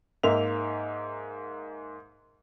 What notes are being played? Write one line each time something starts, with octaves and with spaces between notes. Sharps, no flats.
G#2 A#3 E5 F7